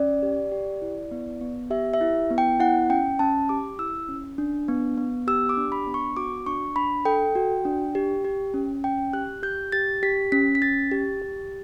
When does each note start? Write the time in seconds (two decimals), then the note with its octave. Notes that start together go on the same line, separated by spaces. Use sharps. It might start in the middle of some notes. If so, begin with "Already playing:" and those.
Already playing: C#4 D5
0.23 G4
0.52 G4
0.82 E4
1.11 B3
1.41 B3
1.70 G4 E5
1.94 E5
2.01 E4
2.30 B3
2.38 G5
2.60 E4 F#5
2.90 C#4 G5
3.19 C#4 A5
3.49 G4 D6
3.79 E4 E6
4.09 C#4
4.38 D4
4.68 B3
4.98 B3
5.27 G4 E6
5.49 D6
5.57 D4
5.72 B5
5.87 B3
5.94 C#6
6.17 F#4 D6
6.46 D4 C#6
6.76 D4 B5
7.05 A4 G5
7.35 F#4
7.65 D4
7.95 G4
8.24 G4
8.54 C#4
8.84 C#4 G5
9.13 G4 F#6
9.43 G4 G6
9.72 G4 A6
10.03 G4 B6
10.32 C#4 B6
10.55 B6
10.62 C#4 A6
10.91 G4
11.22 G4